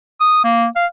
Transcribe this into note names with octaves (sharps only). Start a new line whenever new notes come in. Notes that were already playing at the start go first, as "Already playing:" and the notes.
D#6
A#3
F5